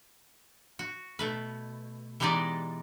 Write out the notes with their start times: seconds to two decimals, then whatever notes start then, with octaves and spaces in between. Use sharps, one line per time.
0.79 F#4
1.19 B2 A3 B4
2.20 E3 G#3 B3 D#4 G4 D5